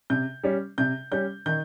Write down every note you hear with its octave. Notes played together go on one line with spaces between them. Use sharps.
C3 G6
G3 C#4
C3 G6
G3 C#4 G6
D#3 G6